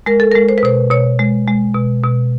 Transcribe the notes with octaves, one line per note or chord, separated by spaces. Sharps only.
G#3 A#4
A4
G#3 A#4
C5
B4
B2 C5
B2 C#5
G#3
G#3
B2
B2